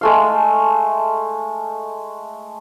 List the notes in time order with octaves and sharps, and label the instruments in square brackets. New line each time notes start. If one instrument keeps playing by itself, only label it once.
[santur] G#3 A3 F5